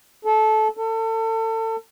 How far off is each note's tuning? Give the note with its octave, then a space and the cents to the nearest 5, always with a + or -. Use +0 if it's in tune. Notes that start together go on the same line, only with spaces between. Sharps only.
A4 -20
A4 +30